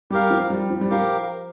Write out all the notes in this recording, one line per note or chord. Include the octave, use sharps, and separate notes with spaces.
G3 G4 A#4 F5
F3
G3
F3
G3
F3 G4 A#4 F5